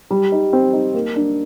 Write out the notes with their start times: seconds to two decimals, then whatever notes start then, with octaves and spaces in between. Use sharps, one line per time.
0.11 G3
0.32 D#4
0.53 C4
0.73 D#4
0.94 A#3
1.16 D4